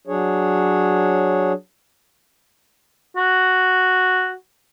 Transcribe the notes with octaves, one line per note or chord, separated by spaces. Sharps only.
F#3 D4 G#4 C#5
F#4